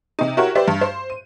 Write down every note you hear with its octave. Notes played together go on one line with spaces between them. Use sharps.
C3 D#4
E4 F#4 G4 A#4 C#5 F#5
G4 B4 C5 D5 E5
G2
C5
D#7